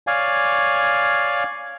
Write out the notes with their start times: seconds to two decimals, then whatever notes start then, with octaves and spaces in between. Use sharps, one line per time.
0.07 C#5 D5 F5 G#5